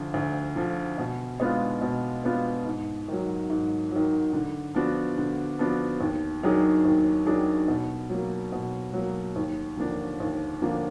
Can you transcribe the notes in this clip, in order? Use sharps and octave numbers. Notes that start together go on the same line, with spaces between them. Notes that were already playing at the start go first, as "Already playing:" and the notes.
Already playing: D2 D3 F3
D2
D3 F3
B2
G#3 B3 D4 F4
B2
G#3 B3 D4 F4
G#2
D#3 F#3
G#2
D#3 F#3
D3
F3 B3 D4 F#4
D3
F3 B3 D4 F#4
D#2
D#3 F#3 D4 G#4
D#2
D#3 F#3 D4 G#4
B2
F#3 A#3
B2
F#3 A#3
D#2
D3 F3 A#3 D4
D#2
D3 F3 A#3 D4